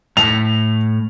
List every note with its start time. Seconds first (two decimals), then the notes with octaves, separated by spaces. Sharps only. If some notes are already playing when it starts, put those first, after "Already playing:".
0.17 A2 A5 F7